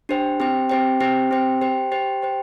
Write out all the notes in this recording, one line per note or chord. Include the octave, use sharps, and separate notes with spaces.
D4 G4 C5 G5
C4 G4 C5 G5
C4 G4 C5 G5
C4 G4 C5 G5
C4 G4 C5 G5
G4 C5 G5
G4 C5 G5
G4 C5 G5